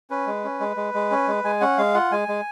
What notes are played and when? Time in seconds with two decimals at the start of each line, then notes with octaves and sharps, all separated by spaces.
0.10 C#4 B4
0.27 G#3
0.44 C#4
0.60 G#3
0.77 G#3
0.94 G#3
1.11 C#4
1.28 G#3
1.44 G#3 G#5
1.61 C#4 F#5
1.78 G#3 F5
1.94 F4 F#5
2.12 G#3 G#5
2.28 G#3